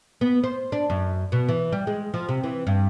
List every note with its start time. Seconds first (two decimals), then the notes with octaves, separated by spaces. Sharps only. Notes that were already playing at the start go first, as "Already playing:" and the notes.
0.21 B3
0.44 C5
0.72 D4
0.90 F#2
1.32 B2
1.49 E3
1.72 G3
1.87 G#3
2.14 F3
2.29 C3
2.44 E3
2.67 G2